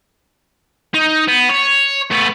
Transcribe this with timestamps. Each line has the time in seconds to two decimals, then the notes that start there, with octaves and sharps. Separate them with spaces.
0.94 D#4
1.28 B3
1.50 C#5
2.11 A3 B3